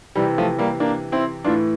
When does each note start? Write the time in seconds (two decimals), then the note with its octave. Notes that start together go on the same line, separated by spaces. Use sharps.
0.16 C3 E3 G3
0.38 F3 A3
0.58 G3 A#3
0.80 A#3 D4
1.12 C4 E4
1.44 A2 E3 D4 F4